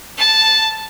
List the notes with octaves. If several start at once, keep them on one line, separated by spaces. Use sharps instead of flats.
A5